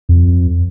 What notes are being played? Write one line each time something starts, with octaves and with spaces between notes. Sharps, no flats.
F2